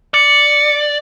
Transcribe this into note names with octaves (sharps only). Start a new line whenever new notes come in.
D5 C#7